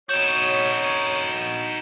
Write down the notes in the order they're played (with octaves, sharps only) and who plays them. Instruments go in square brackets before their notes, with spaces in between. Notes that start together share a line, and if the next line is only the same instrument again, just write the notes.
[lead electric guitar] D#4 F#4 [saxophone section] C#5 [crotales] G6 E7